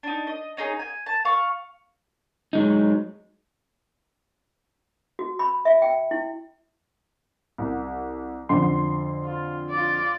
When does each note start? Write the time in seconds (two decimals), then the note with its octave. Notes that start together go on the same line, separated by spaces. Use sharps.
0.03 D4 D#4
0.27 D#5
0.57 C#4 D#4 G#4
0.79 G#5
1.06 A5
1.25 F5 C#6
2.53 F#3 G#3 D#4
5.19 F#4
5.39 B5
5.65 E5
5.82 G5
6.11 E4
7.58 C2
8.49 F2 D3 C6
9.25 F4
9.70 F4 D5